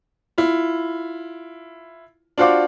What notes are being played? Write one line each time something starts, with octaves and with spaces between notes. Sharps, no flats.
E4 F4
D4 F4 F#4 C5 F5 D6